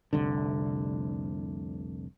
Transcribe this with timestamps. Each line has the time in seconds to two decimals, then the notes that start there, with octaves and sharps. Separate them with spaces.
0.13 F1 C2 D3